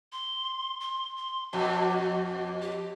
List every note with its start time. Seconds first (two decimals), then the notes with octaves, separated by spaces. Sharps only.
0.12 C6
0.80 C6
1.17 C6
1.53 F2 B2 F#4
2.62 G4